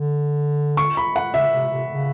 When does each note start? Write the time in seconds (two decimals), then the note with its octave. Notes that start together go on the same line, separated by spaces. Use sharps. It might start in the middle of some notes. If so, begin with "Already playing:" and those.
Already playing: D3
0.77 C#6
0.97 B5
1.16 F#5
1.34 C#3 E5
1.53 C3
1.72 C3
1.91 C#3